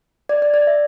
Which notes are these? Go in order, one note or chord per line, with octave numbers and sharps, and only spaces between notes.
D5
D5
D5
E5